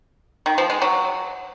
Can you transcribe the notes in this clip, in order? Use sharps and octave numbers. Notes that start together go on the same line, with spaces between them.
D#3
F3
G#3
F#3